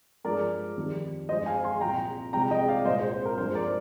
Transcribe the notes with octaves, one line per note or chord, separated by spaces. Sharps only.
G2 F3 G#3 A#4 D5
F2 D#3 G3
G2 F3 G#3 C5 D#5
F5 G#5
G#5 C6
C2 A#2 F3 G5 A#5
C2 C3 F3 G#3 G5 A#5
D#5 G5
D5 F5
C2 A#2 G#3 C5 D#5
C5
C5
A#4
G2 F3 G#3 C5
A#4 D5